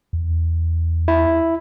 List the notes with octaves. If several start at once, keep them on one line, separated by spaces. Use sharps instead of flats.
E2
E4